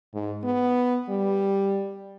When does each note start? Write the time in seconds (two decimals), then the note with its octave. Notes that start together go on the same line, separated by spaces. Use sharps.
0.14 G#2
0.44 B3
1.09 G3